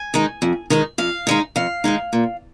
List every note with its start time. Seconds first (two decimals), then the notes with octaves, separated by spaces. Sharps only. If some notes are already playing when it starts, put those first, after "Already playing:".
Already playing: G#5
0.14 D#3 G#3 D#4
0.42 F2
0.70 D#3 G#3 D#4
0.98 F2 F5
1.27 D#3 G#3 D#4
1.56 F2 F5
1.84 D#3 G#3 D#4
2.13 A#2